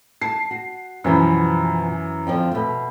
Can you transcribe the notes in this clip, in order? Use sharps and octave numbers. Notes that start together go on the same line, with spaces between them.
A5 C7
F#4
F#2 B2 E3 F3
F2 D3 F3
B2 A3